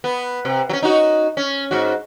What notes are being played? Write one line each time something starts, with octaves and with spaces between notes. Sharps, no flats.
B3
C3
F#3 C#4
D#4 F#4
C#4
G#2 F#4